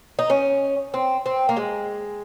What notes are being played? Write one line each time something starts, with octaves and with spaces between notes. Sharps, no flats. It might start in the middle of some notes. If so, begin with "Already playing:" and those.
D#4
C#4
C4
C4
A#3
G#3